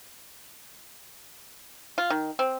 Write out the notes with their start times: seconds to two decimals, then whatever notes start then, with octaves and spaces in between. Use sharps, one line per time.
1.98 F4
2.10 D#3
2.39 C4